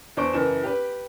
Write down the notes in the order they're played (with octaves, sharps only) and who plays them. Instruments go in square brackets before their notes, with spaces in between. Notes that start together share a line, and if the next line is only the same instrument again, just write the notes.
[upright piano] E2 D4 C5 C#6 D7
F#1 E3 E7
G4 B4